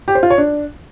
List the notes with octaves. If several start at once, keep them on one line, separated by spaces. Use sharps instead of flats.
G4
C5
F4
C#5
D4